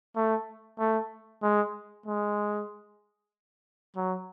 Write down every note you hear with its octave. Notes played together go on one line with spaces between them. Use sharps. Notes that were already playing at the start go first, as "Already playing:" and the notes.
A3
A3
G#3
G#3
F#3